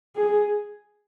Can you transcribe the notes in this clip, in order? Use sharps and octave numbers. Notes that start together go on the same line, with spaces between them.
G#4